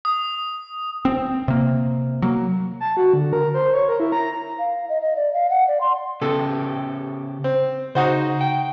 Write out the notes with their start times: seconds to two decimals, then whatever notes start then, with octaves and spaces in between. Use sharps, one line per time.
0.05 D#6
1.05 C4
1.48 C3 A#3
2.22 F#3 A#3
2.80 A5
2.97 F#4
3.14 D3
3.33 A#4
3.54 C5
3.74 C#5
3.88 A#4
4.00 E4
4.12 A#5
4.59 F5
4.89 D#5
5.01 D#5
5.16 D5
5.33 F5
5.50 F#5
5.68 D5
5.81 C6
6.22 C#3 B3 G4 A4
7.44 C4
7.95 C#3 D#4 F#4 C5
8.41 G5